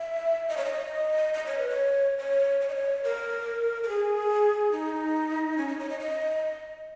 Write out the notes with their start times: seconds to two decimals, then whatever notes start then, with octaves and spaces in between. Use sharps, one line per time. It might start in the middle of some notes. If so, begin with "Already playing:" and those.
Already playing: E5
0.49 D#5
0.57 C#5
0.65 D#5
1.34 D#5
1.46 C#5
1.59 B4
1.70 C#5
2.19 C#5
2.60 C#5
2.69 D#5
2.75 C#5
3.04 A#4
3.83 A#4
3.89 G#4
4.72 D#4
5.58 C#4
5.68 D#4
5.79 C#5
5.90 D#5
6.00 D#5